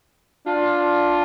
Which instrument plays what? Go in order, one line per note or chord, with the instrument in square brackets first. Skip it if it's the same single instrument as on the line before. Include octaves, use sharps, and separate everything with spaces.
[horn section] D4 F4